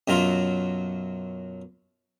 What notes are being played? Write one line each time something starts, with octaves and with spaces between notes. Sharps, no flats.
F#2 B2 F#3 F4